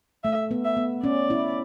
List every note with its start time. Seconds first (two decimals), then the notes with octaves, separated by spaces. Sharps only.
0.24 A3 E5
0.51 B3
0.65 E5
0.77 B3
1.04 C#4 D5
1.30 E4